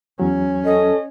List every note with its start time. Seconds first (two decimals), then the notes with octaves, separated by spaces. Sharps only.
0.19 E2 F#3 C#4
0.65 A4 D#5